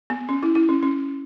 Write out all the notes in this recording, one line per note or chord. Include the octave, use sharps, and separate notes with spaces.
B3
C#4
E4
E4
C#4
C#4